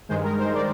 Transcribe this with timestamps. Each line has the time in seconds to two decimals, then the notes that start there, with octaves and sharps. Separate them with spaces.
0.09 G2 D#3 G#3 C5
0.24 A#4
0.39 C5
0.54 D5